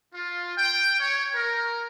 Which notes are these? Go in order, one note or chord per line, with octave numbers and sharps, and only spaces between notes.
F4
G5
C#5
A#4